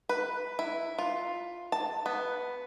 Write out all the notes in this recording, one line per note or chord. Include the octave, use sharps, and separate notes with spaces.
B4
E4
F4
A5
B3